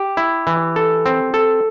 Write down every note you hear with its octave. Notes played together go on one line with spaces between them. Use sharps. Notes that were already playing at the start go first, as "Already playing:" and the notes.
Already playing: G4
E4
E3
A4
C4
A4